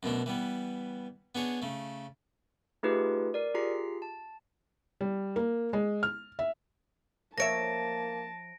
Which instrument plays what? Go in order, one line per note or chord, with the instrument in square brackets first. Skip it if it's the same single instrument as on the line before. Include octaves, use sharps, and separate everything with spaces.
[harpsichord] F#2 B2 A3 D4
E3 G3 B3
B3 D4 G#4 C#5
C#3 A3
[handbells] A3 D#4 F4 G4 G#4 B4
A#4 D5
F4 G4 G#4 A#5 B6 C7
A5
[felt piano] G3
A#3
G#3
F6
E5
[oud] F3 C#5 E5 [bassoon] A#3 [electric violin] A5 [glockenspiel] A#6 D7